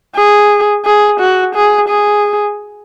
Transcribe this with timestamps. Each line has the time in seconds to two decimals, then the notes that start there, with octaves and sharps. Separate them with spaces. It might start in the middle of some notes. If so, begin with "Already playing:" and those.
0.16 G#4
0.85 G#4
1.20 F#4
1.55 G#4
1.89 G#4